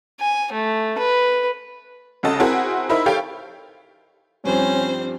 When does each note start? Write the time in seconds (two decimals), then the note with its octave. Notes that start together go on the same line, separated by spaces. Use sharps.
0.20 G#5
0.53 A3
0.99 B4
2.23 C2 C#3 F#4 A4 D#5 A5
2.40 C4 E4 F#4 G#4 A#4 C5
2.89 D#4 E4 A#4 C5 E5 B5
3.06 G4 A4 C#5 F5 G5
4.44 G2 F3 G3 C4 C#4 C5